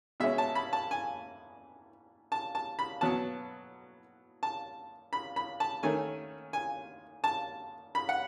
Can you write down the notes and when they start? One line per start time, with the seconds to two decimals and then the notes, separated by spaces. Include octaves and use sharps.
0.20 B2 G#3 C#4 E5
0.38 A5
0.55 B5
0.73 A5
0.91 G#5
2.32 A5
2.55 A5
2.79 B5
3.01 B2 F#3 B3 A5
4.43 A5
5.13 B5
5.36 B5
5.60 A5
5.83 D#3 A3 C#4 G#5
6.53 G#5
7.24 A5
7.95 B5
8.09 F#5